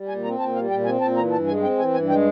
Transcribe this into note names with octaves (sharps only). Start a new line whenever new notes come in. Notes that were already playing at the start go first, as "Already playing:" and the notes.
Already playing: G3
A#2 G#5
C4 A#5
A#2 A5
G3 F5
A#2 G5
C4 G#5
A#2 A5
E3 A#5
G2 A5
G#3 G#5
C4 G5
E3 G#5
G2 G#5
G#3 G5